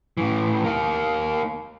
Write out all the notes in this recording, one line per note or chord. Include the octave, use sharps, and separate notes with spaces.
A2 E3
A#3 D#4